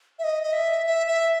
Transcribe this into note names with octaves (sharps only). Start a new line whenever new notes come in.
E5
D#5
D#5
E5
E5
E5